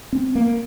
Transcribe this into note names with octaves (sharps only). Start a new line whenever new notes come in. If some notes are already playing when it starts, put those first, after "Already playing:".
C4
A#3